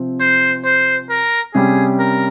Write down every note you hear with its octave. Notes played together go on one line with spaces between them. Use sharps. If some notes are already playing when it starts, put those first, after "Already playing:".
Already playing: C3 F3 C4
C5
C5
A#4
C3 G3 C#4 G4 G#4
A#4